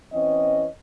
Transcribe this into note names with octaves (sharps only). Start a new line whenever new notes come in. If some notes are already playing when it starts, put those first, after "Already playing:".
E3 C4 C#4 D#5